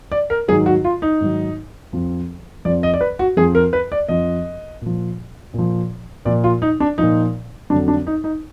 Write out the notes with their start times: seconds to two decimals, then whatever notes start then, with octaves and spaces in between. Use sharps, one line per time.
0.12 D5
0.30 A#4
0.48 G#2 D#3 F#3 G#4
0.66 F#4
0.84 F4
1.02 D#4
1.20 G#2 D#3 F#3
1.93 F2 F3
2.65 F2 F3 D5
2.83 D#5
2.94 D5
3.01 B4
3.19 F#4
3.37 F2 F3 G#4
3.55 A#4
3.73 B4
3.92 D5
4.09 F2 F3 D#5
4.81 A#2 F3
5.54 A#2 F3
6.25 A#2 F3 D5
6.44 F4
6.62 D#4
6.80 D4
6.98 A#2 F3 D#4
7.70 F2 D3 F#3 D4
7.88 D4
8.07 D#4
8.24 D#4